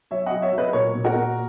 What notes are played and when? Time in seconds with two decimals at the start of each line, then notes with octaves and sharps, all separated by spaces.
0.11 F#3 C#5 E5
0.26 D#5 F#5
0.32 F#3
0.42 C#5 E5
0.52 F#3
0.58 B4 D#5
0.73 A#2 A#4 C#5
0.94 A#2
1.04 F#4 A#4
1.15 A#3